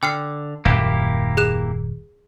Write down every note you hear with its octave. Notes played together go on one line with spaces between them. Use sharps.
D3 G5 F6 C7
D#1 F#2 A#3 E4 G4
G#4 F#6 E7